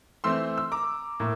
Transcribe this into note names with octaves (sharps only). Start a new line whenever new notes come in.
E3 A3 C4 C6 E6
E6
A#5 D6
A2 A#3